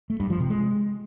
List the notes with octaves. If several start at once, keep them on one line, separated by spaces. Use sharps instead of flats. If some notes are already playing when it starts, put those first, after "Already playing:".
A3
G2
F3
C3
G#3